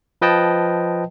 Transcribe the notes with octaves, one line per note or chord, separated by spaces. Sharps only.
F3 B4 D#5 G5 A5